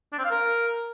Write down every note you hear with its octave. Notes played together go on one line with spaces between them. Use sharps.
D4
C4
F5
A#4